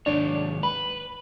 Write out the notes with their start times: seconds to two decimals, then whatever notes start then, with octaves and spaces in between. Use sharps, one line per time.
0.06 D#2 G#2 D4 C#5
0.63 B4 B5